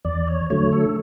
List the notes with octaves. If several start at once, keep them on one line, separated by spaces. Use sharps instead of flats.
E2 D5
C#5
D3 F#3 A3 C#5
A4